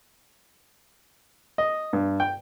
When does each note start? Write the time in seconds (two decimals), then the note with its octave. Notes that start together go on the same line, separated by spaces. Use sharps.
1.58 D#5
1.93 G2
2.20 G5